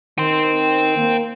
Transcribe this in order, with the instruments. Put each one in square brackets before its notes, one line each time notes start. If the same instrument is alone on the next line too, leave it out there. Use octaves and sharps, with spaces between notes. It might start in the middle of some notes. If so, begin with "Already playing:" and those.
[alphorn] D#3 [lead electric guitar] G5 C6
[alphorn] A#3